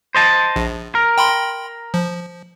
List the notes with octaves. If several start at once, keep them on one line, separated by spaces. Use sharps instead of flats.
C5 D#5 A5
A#1
A#4
G5 B5 C6
F3